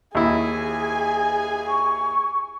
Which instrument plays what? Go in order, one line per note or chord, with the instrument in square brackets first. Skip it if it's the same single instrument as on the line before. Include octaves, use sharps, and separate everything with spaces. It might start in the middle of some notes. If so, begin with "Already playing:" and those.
[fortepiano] D#2 E4 [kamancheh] G#4 G#5
[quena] C#6